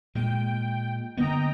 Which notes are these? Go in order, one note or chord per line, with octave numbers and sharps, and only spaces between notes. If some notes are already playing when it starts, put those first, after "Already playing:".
A#2 G#3 G5
D3 A#3 B3 D#5 G5 A#5